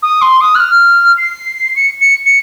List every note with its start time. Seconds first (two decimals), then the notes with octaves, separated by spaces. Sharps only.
0.03 D#6
0.22 C6
0.41 D#6
0.55 F#6
0.60 F6
1.18 C7
1.76 C#7
2.01 C#7
2.26 C#7